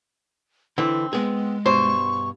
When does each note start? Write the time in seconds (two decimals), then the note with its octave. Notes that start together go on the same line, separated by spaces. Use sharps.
0.78 D3 E3 C4 E4
1.13 G#3 B3 G#4
1.66 G2 B2 C5 C#6